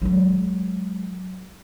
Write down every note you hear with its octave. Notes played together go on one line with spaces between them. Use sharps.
F#3 G#3